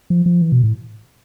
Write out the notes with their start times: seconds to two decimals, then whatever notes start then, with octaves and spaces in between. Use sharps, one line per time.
0.10 F3
0.26 F3
0.42 E3
0.52 B2
0.64 A2